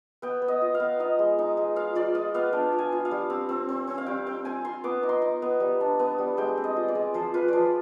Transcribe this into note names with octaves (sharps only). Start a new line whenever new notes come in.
B3 G5
B3
D#5
F4
F5
B3
D#4 D#5
G#3
D#4
G#3
F4 F5
F4 D5
F4 D#5
B3 F5
D4 G5
F4
G#5
F4
F5
G3
C4
C4
C4
C4
F5
G3 G5
C4 G5
C4 G#5
F4 C6
B3 D6
D#4
C6
D#4
B3
G3
D4
B3
G3
G#3 G5
C4
D#5
F4
D5
G#3
F3 C5
F4 B4
F3 C5 D5